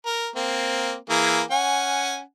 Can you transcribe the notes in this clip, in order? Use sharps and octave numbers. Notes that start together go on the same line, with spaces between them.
A#4
A#3 C4
E3 A#3 G#4
C#4 F#5 G#5